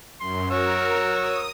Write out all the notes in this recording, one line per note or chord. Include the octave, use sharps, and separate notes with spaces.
F#2 C6
F#4 A#4 C#5 E6
D#6